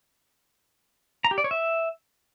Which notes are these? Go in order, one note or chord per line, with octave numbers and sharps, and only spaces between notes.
A#5
G4
D5
C#5
E5